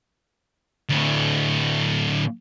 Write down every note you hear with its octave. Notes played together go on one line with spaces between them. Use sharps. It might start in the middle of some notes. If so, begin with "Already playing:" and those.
D2 A2